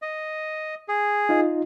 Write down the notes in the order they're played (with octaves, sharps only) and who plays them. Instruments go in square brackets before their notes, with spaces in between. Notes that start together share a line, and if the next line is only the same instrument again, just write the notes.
[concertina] D#5
G#4
[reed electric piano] D#4 F4 D#5